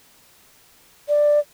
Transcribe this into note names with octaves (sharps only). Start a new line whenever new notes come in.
D5